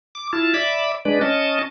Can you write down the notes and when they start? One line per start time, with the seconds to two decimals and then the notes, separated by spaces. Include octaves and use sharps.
0.15 D6
0.33 E4 F4 A5
0.54 D5 E5 B5 D6
1.05 G#3 D4 B4 D5
1.21 C#4 D#5 A5